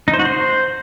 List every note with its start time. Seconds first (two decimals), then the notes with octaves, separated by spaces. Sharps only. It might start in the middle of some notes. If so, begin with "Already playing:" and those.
0.08 D#4
0.14 C5
0.19 F#4
0.25 C5